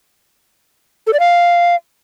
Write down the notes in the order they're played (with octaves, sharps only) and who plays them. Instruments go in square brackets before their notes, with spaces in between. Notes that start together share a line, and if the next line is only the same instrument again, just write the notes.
[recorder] A4
D5
F5